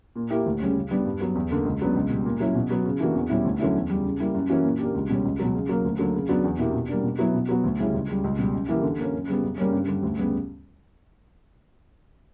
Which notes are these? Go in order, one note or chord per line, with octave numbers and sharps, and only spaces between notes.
A#2
A#3 E4 G4
D2
C#3 G3 C#4
C#3
G3 B3 D4
G2
F#3 B3
E2
D3 A#3
C#2
C#3 F#3 B3 D4
C#2
B2 G3
A#2
F#3 C#4 E4
B2
F#3 B3 F#4
C#3
E3 A#3 D4 F#4
E2
B2 G3 C#4 E4
D2
D3 F#3 C#4 E4
E2
C#3 G3
C#3
G3 A#3 E4
F#2
E3 A#3 C#4 F#4
A#2
A#3 D4 G4
C#2
B2 G3 C#4
C#2
B2 F#3
C#3
F#3 A#3
D2
D3 F#3 A#3
C#3
F#3 B3 D4 F#4
E2
B2 A#3 E4 G4
B2
G3 A#3 D4
B2
F#3 B3 E4
B2
F#3 B3 F#4
D2
C#3 G3 C#4 E4
C#2
C#3 G3
C#2
B2 G3
F#2
E3 A#3 E4 G4
D3
A#3 C#4
F#2
C#3 G3 B3
F#2
C#3 G3 A#3 C#4
G2
D3 G3
D2
C#3 G3 B3